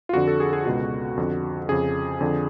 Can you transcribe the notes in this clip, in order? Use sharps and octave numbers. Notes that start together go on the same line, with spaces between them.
F4
F2 D3 F#4
A4
G#4
G#4
C#2 B2 F#4
F2 D3
F2 C#3 G#4
F2 D3